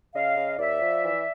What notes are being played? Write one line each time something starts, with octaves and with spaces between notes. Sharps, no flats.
C#3 D#5 F5
C#3
D#2 D5 E5
F3
E3